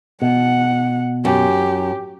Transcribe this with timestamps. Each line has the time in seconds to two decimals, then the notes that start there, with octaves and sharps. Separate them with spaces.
0.22 B2 F#5
1.25 F#2 G4